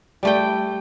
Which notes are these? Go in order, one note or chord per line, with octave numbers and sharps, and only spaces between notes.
G3 A3 G5